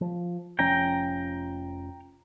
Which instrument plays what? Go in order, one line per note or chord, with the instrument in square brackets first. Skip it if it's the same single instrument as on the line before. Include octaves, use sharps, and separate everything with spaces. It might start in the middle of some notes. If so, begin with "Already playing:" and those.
[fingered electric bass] F3
[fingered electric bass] F1 F3 C#4 [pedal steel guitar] G5 A#5